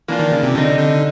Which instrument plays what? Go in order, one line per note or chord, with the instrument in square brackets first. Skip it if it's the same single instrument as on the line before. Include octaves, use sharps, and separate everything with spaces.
[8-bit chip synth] E3 [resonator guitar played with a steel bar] A#3 D4 F4
[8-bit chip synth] D#3
C#3
C3
[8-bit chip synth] D3 [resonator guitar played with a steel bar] G3 C4 D#4
[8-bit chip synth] D3